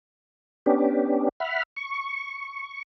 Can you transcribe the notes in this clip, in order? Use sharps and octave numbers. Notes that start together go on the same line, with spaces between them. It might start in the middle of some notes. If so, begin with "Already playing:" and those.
B3 C#4 D4 G4
E5 F#5 B5 F6
C#6